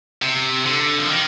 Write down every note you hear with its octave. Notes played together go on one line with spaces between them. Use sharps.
C3
D3
F3
D#3